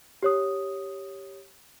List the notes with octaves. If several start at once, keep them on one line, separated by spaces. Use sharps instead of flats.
G4 C#5 D#6